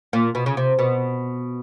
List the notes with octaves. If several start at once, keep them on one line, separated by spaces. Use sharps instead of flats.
A#2
B2
C#3
C3
B2